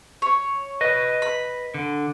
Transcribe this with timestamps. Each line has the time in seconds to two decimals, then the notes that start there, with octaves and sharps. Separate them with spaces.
0.22 C#5
0.81 B4 D#5
1.22 B5
1.74 D3